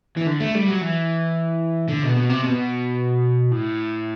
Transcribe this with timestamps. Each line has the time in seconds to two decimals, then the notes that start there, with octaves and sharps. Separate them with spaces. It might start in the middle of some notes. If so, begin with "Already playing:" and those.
0.17 E3
0.27 D3
0.40 A3
0.55 G3
0.68 F#3
0.81 E3
1.89 D3
2.03 B2
2.17 B2
2.30 C3
2.44 B2
3.52 A2